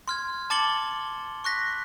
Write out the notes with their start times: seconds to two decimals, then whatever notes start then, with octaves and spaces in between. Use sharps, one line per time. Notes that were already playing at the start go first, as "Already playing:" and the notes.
0.08 C6 F6 G#6
0.50 A5 D6 A6 C#7 F#7 G7
1.44 C#6 F#6 A#6 B6